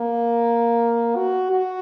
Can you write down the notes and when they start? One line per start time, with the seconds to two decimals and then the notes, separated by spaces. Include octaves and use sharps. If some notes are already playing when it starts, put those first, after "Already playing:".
Already playing: A#3
1.16 F#4
1.51 F#4